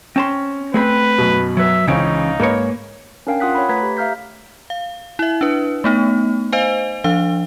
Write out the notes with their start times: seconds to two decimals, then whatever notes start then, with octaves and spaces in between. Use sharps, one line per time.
0.16 C4 C#4 A5 C6
0.74 A3 C4 G#4 B4 B5
1.18 F#2 B2
1.57 F#3 B4 E5
1.87 C#2 C#3 E3 C4 C#4 D#4
2.40 G#2 A#3 B4 C#5
3.27 C#4 D4 A#4 F5 G5 G#5
3.40 F4 F#5 D#6 F#6 B6
3.55 C#5 B5
3.69 A3 B4 A#5 G#6 B6
3.83 G4
3.97 E5 F5 A#5 F6 G6 B6
4.70 F5
5.19 E4 E5
5.41 D4 B4
5.84 A3 B3 D#4
6.52 C5 D#5 F5 G#5
7.04 F3 D4 F5